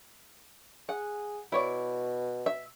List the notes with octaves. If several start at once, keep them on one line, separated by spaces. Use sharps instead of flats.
G#4 F#5
B2 E4 C#5 D5
E5